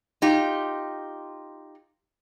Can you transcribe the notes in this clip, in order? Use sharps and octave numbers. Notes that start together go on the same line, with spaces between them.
D#4 F4 G4